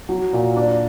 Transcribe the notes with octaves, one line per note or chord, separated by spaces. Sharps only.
F#3
A#2
D4